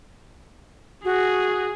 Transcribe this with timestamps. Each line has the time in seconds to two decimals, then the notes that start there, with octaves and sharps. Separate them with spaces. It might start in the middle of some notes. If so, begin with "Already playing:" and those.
1.05 F#4 G#4